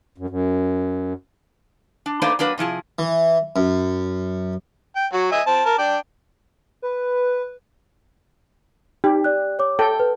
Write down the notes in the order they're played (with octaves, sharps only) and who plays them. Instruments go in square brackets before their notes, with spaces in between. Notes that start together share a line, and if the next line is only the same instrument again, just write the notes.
[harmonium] F#2
F#2
[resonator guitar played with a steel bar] D4
A3 A#3 D4 D#4 B4 C5
F#3 A#3 D4 B4
C3 F3 E4 G#4
[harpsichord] E3
F#2
[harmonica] G5
F#3 F#4
D#5 E5 G#5
C4 A5
A#4 A5
D4 D5 G5
[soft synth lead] B4
[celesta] D#4 [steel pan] G4
[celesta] D5 F#6
C#5 D6
[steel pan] A4 G5
[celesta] B4